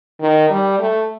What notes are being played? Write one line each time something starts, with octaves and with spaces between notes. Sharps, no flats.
D#3
G3
A3